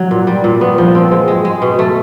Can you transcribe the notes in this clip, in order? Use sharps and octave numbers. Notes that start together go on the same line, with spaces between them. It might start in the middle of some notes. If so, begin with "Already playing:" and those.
Already playing: F#3
A#2
G3
A#2
B3
F3
C4
G#3
G#3
G#3
B2
A3